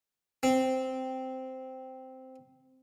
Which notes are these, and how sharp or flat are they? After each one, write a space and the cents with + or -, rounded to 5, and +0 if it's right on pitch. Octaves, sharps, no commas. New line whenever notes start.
C4 -5